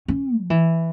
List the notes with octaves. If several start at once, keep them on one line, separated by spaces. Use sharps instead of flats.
C#4
F3
E3